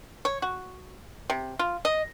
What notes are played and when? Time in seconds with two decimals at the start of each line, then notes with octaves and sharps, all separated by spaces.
0.25 C#5
0.42 F#4
1.30 C3
1.59 F4
1.85 D#5